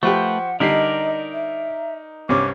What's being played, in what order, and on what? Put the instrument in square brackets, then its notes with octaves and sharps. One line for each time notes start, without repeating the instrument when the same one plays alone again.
[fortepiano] F3 G4 [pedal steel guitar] A3 B4 [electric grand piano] C5 C#6 [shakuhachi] F#5
[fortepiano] D3 G3 [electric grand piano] D#4 B6 C7 [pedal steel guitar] A#4 D5 [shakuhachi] D#5
[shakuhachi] E5
[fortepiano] C2 G2 C#4 [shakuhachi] D6